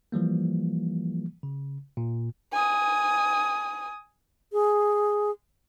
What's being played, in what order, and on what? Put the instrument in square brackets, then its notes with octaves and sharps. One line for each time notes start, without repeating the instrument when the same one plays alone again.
[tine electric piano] E3 F3 G3 A#3
C#3
A#2
[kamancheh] G#5 D#6
[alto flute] G#4